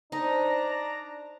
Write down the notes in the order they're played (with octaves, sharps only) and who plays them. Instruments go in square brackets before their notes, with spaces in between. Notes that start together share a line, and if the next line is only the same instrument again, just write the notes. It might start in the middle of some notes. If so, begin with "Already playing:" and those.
[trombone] D4 [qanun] D#4 [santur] C5 A5 [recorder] A#5